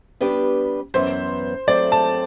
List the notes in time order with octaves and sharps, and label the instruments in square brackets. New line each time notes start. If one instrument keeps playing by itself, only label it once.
[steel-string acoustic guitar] G3 B3 D4 G4 B4
[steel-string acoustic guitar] F#2 E3 B3 [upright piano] C5
[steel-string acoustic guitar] F#3 A3 C4 [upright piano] D5
[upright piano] A5